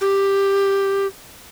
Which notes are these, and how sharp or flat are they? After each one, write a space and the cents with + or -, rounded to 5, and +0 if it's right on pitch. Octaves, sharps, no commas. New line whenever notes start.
G4 +5